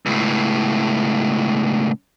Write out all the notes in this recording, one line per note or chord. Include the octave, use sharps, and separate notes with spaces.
C#2 A2